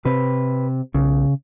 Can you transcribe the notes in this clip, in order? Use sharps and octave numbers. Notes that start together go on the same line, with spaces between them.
C3 C4 B4
B1 C#3